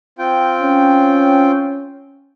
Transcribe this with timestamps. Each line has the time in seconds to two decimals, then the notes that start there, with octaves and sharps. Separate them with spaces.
0.19 C4 F4 G5
0.61 C#4